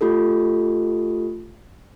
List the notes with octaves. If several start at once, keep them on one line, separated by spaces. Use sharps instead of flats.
A3 F4 G4 A4